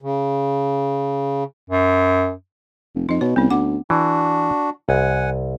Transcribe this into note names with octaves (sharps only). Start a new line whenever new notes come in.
C#3
F#2
F1
F2 D#4 D#5
B2 C#5
C2 B3 C#4
D2 C4 F#5 D6
E3 D4 F#4
C2 F#5 G#5